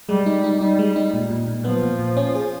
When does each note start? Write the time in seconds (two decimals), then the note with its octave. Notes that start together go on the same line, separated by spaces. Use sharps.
0.09 G3 G#3
0.26 D#4
0.44 D#4
0.61 G3 D#4
0.79 G#3
0.96 D#4
1.14 A#2
1.30 A#2
1.48 A#2
1.65 F3 B3
1.83 A#2
1.99 A#2
2.17 C#4
2.35 G#4